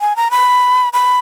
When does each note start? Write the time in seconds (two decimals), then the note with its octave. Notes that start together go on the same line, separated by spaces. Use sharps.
0.01 G#5
0.16 A#5
0.31 B5
0.93 B5